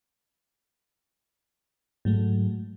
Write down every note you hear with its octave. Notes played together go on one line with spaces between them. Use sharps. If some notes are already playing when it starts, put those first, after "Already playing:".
G#2 F#3 A3